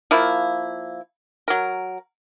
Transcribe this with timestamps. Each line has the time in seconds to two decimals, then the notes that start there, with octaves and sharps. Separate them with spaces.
0.11 F3 A#3 E4
1.48 F#3 A#4